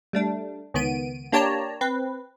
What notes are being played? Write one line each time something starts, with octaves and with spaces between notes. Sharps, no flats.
G3 A3 D4
C#2 D#3 B3 D7 D#7
A#3 D4 G4 C#5 A5 A#5
C4 B4